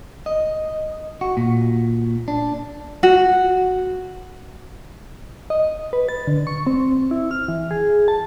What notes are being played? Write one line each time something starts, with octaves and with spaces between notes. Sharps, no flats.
D#5
F#4
A#2
D4
F#4
D#5
B4
A6
D3
C#6
C4
E4
F6
E3
G#4
A5